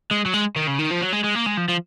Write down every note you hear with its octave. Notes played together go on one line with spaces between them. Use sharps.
G#3
F#3
G#3
D#3
C#3
D#3
F3
F#3
G#3
G#3
A#3
G#3
F3
F3